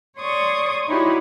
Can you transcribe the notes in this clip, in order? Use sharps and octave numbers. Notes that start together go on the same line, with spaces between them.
C#5 D5 C6 C#6 D#6
D#4 E4 F#4 G4 C#5